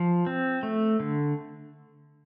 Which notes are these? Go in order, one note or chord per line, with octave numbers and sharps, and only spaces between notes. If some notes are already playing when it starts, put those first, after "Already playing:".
Already playing: F3
C4
A3
D3